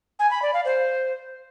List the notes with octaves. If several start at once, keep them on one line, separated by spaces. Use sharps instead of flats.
G#5
B5
D5
F5
C5